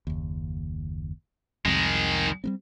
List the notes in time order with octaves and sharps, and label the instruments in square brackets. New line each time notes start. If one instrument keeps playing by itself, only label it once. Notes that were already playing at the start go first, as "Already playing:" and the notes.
[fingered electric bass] F#1 D#2
[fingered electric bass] C2 F2 [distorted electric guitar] D#3 G#3
[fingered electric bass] G3 B3 C4